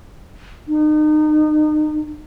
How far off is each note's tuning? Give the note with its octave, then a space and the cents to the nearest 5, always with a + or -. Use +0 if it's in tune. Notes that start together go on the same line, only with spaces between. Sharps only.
D#4 -35